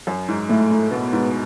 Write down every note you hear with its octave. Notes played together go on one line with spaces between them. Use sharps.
F#2
G#2
A2 A3
A2
B2 B3
G#2